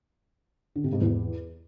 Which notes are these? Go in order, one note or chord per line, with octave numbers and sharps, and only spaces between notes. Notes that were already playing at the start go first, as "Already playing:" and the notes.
D3
C3
G#2
E2